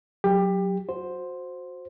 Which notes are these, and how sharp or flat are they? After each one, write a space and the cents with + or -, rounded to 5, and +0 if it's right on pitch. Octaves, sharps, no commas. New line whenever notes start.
F#3 +0 G4 +20
F#4 -20 C5 +0